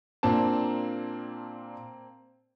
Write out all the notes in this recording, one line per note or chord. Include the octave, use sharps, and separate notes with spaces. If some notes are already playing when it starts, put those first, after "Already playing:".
A#2 A#3 C4 D4 A5